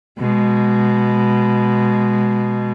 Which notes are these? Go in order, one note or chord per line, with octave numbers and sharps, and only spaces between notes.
B2 G#3